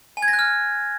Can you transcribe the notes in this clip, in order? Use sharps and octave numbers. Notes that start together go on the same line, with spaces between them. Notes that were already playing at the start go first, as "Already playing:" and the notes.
G#5
G#6
A#6
F#6
F6